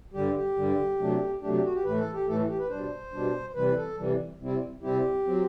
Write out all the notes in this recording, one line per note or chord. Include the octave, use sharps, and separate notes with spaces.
G2 D3 G3 G4
G4
G2 D3 G3
C3 F#3 A3 D4
C3 F#3 A3 D4 G4
G4
F#4
G4
A2 E3 A3 B4
A4
G4
A2 E3 A3 A4
G4
B4
B2 G3 D4 C5
B2 G3 D4
C3 E3 G3 B4
A4
C3 E3 G3
C3 G3 C4 E4
C3 G3 C4 E4 G4
F#3 C4